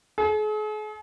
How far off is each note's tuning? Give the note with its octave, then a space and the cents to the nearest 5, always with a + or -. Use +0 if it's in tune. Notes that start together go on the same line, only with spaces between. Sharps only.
G#4 +45